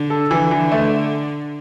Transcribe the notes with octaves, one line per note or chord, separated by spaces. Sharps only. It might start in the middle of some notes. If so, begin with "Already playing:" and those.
Already playing: D3
A4
D3 E3
E3
A3